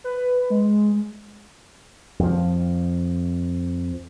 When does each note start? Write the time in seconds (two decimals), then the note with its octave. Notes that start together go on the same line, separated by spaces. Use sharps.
0.04 B4
0.50 G#3
2.19 F2 F3